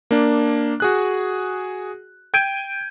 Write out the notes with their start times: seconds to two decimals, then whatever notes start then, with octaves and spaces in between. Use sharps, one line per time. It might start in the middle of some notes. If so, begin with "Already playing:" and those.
0.11 A#3 D4
0.80 F#4 G#4 F#6
2.34 G5 G6 G#6 D7 D#7